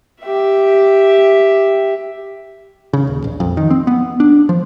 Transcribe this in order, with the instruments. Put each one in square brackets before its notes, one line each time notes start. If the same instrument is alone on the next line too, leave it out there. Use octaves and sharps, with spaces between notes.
[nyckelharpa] G4 E5
[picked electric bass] C#3
D#1
A#1
F2
D#3
C4
B3
D4
F3